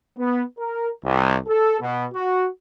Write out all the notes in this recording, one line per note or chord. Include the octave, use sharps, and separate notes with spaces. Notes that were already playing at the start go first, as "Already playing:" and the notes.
B3
A#4
C2
A4
B2
F#4